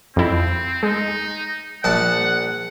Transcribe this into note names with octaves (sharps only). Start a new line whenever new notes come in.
F2 C4 E4
G#3 D#4
A#1 F#5 A5